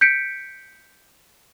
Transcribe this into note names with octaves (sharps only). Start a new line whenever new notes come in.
G6 B6 C#7 D7